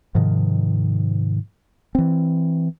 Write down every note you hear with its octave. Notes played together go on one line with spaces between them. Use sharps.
G#2 C3 D#3 F3
E3 C4